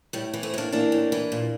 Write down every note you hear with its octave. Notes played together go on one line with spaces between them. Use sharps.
A2 G3
E3
A3 C4
A2 A#3 D4
E3 A#3 D4
A2
E3
A#2